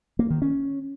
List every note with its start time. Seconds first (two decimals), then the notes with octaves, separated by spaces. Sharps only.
0.19 A#3
0.30 D#3
0.42 C#4